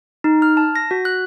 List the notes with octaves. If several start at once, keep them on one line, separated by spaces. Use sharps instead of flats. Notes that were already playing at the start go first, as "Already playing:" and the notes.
D#4
F6
A5
A#6
F#4
F#6